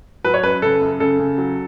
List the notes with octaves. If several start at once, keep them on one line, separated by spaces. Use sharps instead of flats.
F#3 B4
C#5
F#2 B4
C#3 A4
F#2
C#3 A4
C#3
F#3